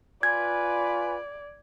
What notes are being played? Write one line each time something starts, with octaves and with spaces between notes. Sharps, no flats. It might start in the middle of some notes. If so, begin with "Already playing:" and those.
F4 B4 D5 G#5 G#6